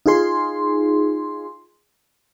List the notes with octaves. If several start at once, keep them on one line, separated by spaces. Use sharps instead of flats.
D#4 F4 G#4 C6